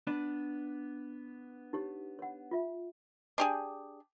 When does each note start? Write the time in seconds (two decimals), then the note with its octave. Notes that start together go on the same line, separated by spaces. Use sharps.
0.07 B3 D4 B4
1.73 D#4 G4 C#5
2.19 C#5 F#5
2.51 F4 E5
3.38 D4 G4 G#4